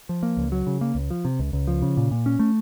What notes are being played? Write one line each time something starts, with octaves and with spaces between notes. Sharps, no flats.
F3
A#3
C#2
F#3
C#3
A#3
C#2
F3
C3
C#2
C#2
F3
C#3
A#2
A#2
C#4
A3